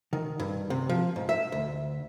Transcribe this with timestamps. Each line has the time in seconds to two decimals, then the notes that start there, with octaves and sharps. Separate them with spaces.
0.13 D#3
0.40 G2
0.70 C3
0.89 F3
1.16 G#2
1.29 E5
1.52 D2